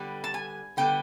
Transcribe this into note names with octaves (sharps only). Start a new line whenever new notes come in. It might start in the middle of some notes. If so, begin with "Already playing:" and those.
Already playing: D3 G3 B3
A5
G#5
D3 G3 B3 G5